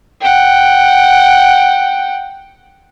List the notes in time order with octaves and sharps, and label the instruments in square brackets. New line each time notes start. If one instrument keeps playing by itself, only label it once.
[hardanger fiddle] F#5 G5